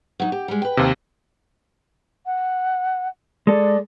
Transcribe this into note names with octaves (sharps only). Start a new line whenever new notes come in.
F#3 D#4
G4
G3 G#3
B4 G5
D#2 C3
F#5
G#3 A4 D5